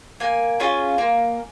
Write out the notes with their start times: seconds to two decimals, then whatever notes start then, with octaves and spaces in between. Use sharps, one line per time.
0.20 A#3 G#5
0.60 C#4 F4 G#4
0.98 A#3